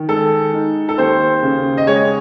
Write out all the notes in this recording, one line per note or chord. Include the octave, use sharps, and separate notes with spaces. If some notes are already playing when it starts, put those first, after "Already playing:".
Already playing: D#3
G#3 A4
D#4
A4
D#2 C5
C#3
D#5
G#3 C#5